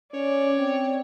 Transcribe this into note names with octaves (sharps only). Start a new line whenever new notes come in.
C#4 C#5 D5
C4